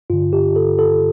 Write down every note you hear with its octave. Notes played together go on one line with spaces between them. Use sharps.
G2 D3 F4
G4
A4
A4